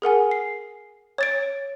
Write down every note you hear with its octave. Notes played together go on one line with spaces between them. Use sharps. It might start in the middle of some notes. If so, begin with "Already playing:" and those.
G#4 A#4 F#5 G#5
C7
C#5 A6 D7